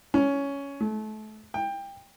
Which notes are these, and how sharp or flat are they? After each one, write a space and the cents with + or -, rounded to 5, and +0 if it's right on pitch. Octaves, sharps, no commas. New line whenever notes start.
C#4 +10
A3 -30
G5 +20